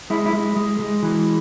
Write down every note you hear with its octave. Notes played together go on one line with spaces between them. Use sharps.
G#3 E4
E4
G#3
G#3
G#3
E3